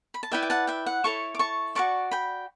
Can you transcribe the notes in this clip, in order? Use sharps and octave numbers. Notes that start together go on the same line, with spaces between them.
B5
A5
E4 B4 D5 E5 G5
G5
F#5 A5
E5 G5
F#5
E4 A4 C#5 A5 C#6
D6
A5 C#6
F#4 B4 D5 A5 C#6
G5 B5